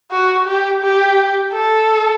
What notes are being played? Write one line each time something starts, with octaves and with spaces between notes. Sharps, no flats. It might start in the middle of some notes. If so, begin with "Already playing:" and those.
F#4
G4
G4
A4